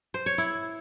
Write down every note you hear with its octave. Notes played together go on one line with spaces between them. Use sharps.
C5
C#5
E4